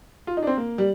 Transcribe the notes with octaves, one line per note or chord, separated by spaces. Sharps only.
F4
D#4
D4
C4
A#3
G3